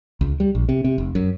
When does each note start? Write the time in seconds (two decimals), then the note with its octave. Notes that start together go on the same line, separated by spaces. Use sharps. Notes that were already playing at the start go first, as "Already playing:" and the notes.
0.21 C#2
0.40 G3
0.55 A#1
0.69 C3
0.84 C3
0.98 F1
1.15 F#2